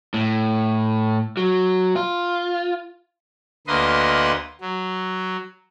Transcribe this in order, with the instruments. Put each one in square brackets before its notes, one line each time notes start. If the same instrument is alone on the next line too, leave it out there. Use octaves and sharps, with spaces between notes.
[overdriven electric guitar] A2
F#3
F4
[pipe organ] D2 A#3 B4 D#5 C6
F#3